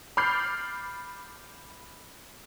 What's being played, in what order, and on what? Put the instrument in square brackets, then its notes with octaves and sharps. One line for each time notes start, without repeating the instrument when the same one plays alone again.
[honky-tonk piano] B5 D6 F6 G6 A6 C7